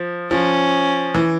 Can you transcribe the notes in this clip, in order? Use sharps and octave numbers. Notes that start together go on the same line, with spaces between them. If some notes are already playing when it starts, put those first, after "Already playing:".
Already playing: F3
F3 C#4
E3